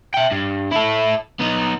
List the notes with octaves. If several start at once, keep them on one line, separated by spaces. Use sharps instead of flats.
E5 G5
G2
E4 A4
B3 D#4